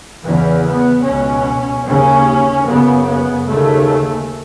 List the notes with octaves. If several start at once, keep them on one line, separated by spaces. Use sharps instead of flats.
E2 C#3 E3
B3
C#2 B2 C#4
D#2 C#3 C#4
F#2 C#3 B3
B3
D#2 C#3 A3